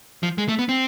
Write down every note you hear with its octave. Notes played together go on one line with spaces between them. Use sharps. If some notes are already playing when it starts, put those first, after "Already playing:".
F3
G#3
A3
B3
C4